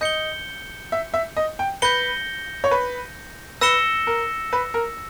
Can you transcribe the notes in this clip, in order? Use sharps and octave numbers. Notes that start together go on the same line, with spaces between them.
D#5 G6 C#7 G7
E5
E5
D#5
G5
B4 G6 A#6 C#7 G7
C#5
B4
B4 E6 A#6 C#7 E7 G7
A#4
B4
A#4